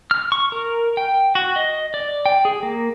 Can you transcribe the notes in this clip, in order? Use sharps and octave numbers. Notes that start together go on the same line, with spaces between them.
F6
C#6
A#4
G5
F#4
D#5
D5
G5
G#4
A#3